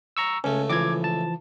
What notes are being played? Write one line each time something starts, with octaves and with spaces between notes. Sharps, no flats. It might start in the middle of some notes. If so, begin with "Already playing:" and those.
A#5 C#6 E6
C#2 A3 C#4
E3 F3 D6 G#6
A5